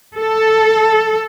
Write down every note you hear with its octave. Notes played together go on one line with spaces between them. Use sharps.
A4